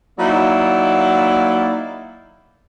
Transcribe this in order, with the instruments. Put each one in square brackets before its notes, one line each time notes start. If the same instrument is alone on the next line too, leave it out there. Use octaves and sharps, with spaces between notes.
[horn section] F#3 A#3 D#4 E4 D5 F5